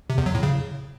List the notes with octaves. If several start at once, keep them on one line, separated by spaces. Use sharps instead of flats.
C3
E2
F#3
A2
C#3